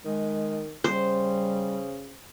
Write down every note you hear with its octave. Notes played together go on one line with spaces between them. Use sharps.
D#3 G#3
C#3 G3 C5